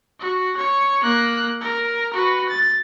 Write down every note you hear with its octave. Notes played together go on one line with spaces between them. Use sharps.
F#4
C#5
A#3 F#6
A#4
F#4 B4
A6